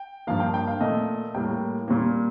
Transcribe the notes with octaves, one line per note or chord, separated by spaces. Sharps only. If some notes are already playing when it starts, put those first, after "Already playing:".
Already playing: G5
G2 F3 A#3 F5
G5
G5
F5
A#2 A3 D#5
A2 G3 A#3 G5
A#2 G3 A#3